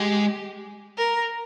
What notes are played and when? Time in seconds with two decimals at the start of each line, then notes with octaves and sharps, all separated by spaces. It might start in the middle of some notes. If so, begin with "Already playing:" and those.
Already playing: G#3 G4
0.98 A#4